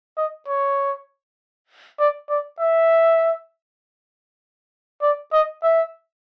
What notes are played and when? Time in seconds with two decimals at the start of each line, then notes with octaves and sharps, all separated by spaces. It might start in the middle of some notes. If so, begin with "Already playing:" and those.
0.17 D#5
0.48 C#5
1.99 D5
2.29 D5
2.60 E5
5.02 D5
5.33 D#5
5.63 E5